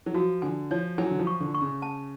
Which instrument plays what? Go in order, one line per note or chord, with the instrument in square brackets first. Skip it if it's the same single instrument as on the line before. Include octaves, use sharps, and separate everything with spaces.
[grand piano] F#3
[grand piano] F3 [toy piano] F#4
[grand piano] D3 [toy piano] G#5
[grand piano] F3 [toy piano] C#5
[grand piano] F#3 [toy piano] G#5
[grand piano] D3
F3
[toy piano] C#6
[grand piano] D3
[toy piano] C#6
[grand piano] C#3
[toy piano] A5